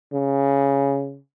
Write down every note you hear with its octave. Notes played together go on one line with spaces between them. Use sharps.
C#3